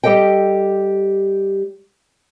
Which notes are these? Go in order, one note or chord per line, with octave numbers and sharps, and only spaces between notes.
G3 G4 A4 D#5 G5